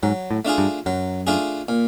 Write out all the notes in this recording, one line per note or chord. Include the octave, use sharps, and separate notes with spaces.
G#2 F#3
A2
A3 D4 F4 G#4
G2
F#2 F#3
A3 D4 F4 G#4
A#2